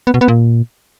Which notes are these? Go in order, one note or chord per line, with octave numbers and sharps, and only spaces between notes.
B3
B2
B3
A#2